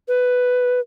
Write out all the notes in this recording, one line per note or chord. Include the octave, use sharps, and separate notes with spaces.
B4